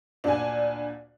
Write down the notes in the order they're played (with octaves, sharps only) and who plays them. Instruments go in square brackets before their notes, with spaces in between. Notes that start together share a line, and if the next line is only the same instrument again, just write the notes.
[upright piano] D2 A#2 D3 [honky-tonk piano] D4 G#5